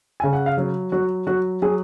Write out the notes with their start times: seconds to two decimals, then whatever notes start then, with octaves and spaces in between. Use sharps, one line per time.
0.20 C#3 G#5
0.33 F#5
0.46 F5
0.58 F#3
0.92 F#3 F#4
1.27 F#3 F#4
1.62 F#3 G#4